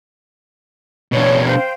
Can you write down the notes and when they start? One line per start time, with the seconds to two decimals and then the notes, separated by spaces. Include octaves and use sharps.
1.13 B2 D4 C#5
1.46 C5 F5 G5